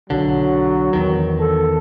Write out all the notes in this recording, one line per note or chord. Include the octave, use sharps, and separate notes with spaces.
B1 D3 F#3
E2 D#3
A4